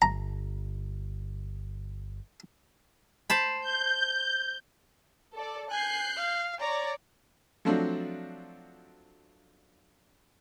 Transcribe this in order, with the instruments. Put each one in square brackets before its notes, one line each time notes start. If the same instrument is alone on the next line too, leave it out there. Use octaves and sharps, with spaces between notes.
[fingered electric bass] G1 [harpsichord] A#5
[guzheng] C5 A5 B5
[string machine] G6
[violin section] A4 D5
[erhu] G#5 [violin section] F#6 G6 C7
[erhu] F5
[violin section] C#5 D5 [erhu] A#5
[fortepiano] F3 F#3 A3 C4 D4 F#4